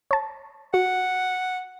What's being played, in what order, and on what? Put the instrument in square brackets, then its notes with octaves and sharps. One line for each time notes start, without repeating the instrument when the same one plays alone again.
[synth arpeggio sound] C#5 A5
[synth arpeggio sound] F#4 [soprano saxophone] F#5